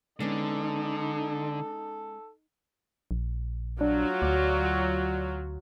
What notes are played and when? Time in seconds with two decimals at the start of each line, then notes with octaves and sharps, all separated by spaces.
0.20 D3 G#3 B3 C#4 D#4 A4
3.11 A#1
3.81 F#3 D4 F4 F#4
4.22 D2 D5